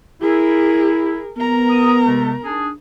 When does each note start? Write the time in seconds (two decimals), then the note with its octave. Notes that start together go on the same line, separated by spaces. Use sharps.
0.21 E4 G#4 A#4
1.37 B3 A#4 A#5
1.70 D#6
2.06 C3 G#3 A3
2.43 D4 D#4 G#4